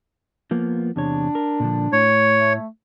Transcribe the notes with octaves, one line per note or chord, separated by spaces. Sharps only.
F3 A#3 B3
E2 C3 D4 C#5
A#4
A#2 D3 F3
A2 C#5
A3